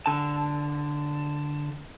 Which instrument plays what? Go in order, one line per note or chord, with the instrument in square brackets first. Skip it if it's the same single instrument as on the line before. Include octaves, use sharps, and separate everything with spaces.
[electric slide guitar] D3 A5